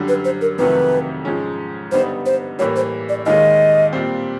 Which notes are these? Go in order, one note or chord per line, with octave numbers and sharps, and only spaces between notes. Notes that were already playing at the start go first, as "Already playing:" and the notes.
Already playing: F#2 D3 G3
B4
C5
A#4
F2 C3 D#3 F#3 A3 B4
G#2 F3 G#3 C#4
G2 D3 G3 B3 D#4 C5
C5
A2 E3 G3 A#3 C#5
C5
D5
D#2 D#3 G#3 D#5
A#2 G3 C4